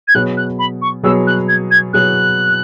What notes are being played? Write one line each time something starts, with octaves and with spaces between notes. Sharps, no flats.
G#6
B2 F#3 B3 G#4 C#5 F#6
F#6
B5
C#6
B2 F#3 B3 G#4 C#5 E6
F#6
G#6
G#6
B2 F#3 B3 G#4 C#5 F#6